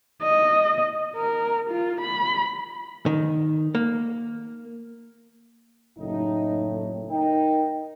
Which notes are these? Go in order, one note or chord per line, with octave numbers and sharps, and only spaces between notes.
D#5
A#4
F4
B5
D#3
A#3
F#1 A2 D#4
D#4 A#4 G5